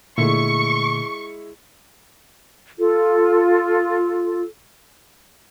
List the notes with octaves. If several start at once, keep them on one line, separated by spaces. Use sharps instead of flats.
A#2 D3 G#3 A3 E4 C#6
F4 A4